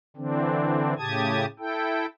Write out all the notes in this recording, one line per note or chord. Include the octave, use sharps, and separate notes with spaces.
D3 E3 C4 D4
A2 C#3 G4 A5 D#6 G#6
E4 A4 G5